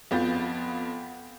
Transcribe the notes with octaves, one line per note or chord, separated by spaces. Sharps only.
F2 B3 F4 G6 A6